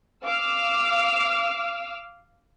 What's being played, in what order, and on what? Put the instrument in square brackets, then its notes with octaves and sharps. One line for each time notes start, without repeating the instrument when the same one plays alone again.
[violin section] F5 D6 E6 F6